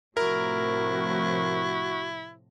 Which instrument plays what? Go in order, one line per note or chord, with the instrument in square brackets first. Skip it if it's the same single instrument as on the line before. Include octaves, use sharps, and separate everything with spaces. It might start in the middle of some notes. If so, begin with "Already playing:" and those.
[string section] A2 C3 F3 [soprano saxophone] E4 [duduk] F#4 [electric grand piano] A#4